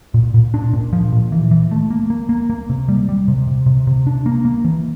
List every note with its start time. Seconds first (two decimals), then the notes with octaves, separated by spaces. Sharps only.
0.14 A#2
0.34 A#2
0.54 D4
0.73 A#2
0.93 F3
1.12 A#2
1.32 E3
1.51 E3
1.71 A3
1.90 A#3
2.10 A#3
2.29 A#3
2.50 A#3
2.69 C3
2.89 G3
3.09 G3
3.28 C3
3.47 C3
3.66 C3
3.87 C3
4.07 D4
4.26 A#3
4.45 A#3
4.65 E3